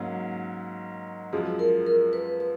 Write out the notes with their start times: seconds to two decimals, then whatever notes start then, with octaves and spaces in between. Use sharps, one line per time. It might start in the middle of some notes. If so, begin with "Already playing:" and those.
Already playing: G#2 F#3 A#3 C#4
1.33 F#2 F3 G#3 G#4
1.59 A#4
1.87 A#4
2.13 B4
2.40 B4